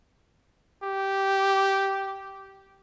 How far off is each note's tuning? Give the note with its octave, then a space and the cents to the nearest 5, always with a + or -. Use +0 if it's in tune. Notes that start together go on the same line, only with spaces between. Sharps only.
G4 -10